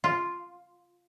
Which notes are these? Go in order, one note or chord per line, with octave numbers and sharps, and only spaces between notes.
F4